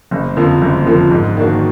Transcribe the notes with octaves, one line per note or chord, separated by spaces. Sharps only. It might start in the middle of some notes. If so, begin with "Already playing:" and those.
F#1
F2 D3 F3 A#3
F#1
F2 D3 F3 A#3
G#2
D#3 A#3 D4 F#4